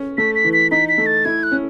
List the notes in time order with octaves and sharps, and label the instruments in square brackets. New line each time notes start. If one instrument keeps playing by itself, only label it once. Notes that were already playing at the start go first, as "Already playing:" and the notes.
Already playing: [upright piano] C#4
[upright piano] A3 [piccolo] B6
[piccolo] B6
[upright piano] E3
[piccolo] B6
[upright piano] D#4 [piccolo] B6
[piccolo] B6
[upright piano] A3
[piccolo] A6
[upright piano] E4 [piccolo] G#6
[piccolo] F#6
[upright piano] C#4